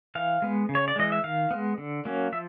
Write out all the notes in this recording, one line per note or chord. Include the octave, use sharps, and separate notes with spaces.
E3 F5
G#3 B3
C#3
C#5
D5
E3 G#3 D#5
E5
D#3 F5
G#3 B3
D3
F#3 A#3 C#4
F3 E5